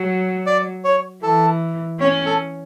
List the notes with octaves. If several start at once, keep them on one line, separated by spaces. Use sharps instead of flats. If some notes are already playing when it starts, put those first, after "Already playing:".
Already playing: F#3
D5
C#5
E3 A4
C#4 C#5
A4